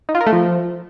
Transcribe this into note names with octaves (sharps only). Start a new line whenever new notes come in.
D#4
F4
A#4
A3
F3